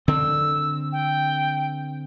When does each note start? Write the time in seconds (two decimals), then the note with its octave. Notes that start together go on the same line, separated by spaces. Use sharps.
0.08 D3 C4 E6
0.92 G5